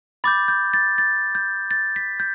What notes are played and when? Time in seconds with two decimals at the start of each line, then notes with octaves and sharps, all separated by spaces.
0.24 B5 D6 G6 A6
0.48 G6
0.74 A6
0.98 A6
1.35 G6
1.71 A6
1.96 B6
2.20 G6